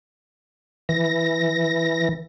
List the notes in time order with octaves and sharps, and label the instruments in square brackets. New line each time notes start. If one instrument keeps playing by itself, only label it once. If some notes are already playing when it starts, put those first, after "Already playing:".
[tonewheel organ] E3 A#6